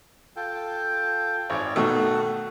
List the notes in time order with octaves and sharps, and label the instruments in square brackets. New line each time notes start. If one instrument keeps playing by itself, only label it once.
[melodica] F4 A4 G5
[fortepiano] G#1 [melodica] C#5 D5
[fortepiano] B2 D#3 A3 [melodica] F#4 A4 F#5